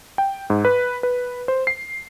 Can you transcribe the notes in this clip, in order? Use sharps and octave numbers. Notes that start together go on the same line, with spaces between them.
G5
G#2
B4
B4
C5
C7